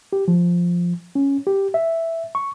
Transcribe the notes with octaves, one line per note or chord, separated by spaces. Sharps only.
G4
F3
C#4
G4
E5
C#6